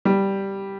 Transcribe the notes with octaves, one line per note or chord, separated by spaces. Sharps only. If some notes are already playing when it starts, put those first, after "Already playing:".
G3